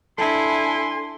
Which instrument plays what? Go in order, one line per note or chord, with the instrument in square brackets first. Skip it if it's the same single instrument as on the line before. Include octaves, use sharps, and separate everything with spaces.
[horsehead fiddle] D4 G#5 [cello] E4 [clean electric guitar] A4 [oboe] C6